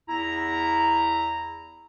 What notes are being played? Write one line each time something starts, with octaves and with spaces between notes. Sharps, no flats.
E2 E4 A#5